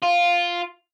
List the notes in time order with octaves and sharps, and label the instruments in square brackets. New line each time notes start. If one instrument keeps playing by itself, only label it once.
[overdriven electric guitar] F4